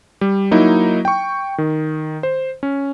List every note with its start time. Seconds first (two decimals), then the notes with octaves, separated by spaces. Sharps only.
0.21 G3
0.51 F#3 A#3 D#4 E4
1.05 G5 C#6
1.58 D#3
2.23 C5
2.63 C#4